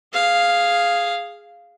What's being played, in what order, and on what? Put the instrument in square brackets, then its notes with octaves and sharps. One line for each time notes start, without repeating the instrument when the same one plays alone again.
[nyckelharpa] G#4 F5